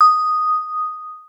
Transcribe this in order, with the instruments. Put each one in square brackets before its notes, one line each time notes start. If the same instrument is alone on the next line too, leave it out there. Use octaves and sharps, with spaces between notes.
[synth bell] D#6